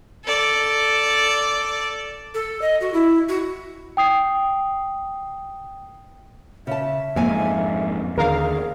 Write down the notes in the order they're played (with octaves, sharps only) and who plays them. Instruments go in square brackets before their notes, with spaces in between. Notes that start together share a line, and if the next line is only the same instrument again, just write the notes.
[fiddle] A4 D5
[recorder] A4
D#5
F#4
E4
F#4
[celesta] G5 D#6 C7
[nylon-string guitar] C#3 A5 [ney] E5
[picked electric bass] F2 G#2 [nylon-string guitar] A#3 G#5
[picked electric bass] D#2 D3 [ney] G#4 [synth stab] A#4 F5